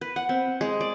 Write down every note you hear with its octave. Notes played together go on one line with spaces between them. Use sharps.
B4
F#5
C4
G#3
D5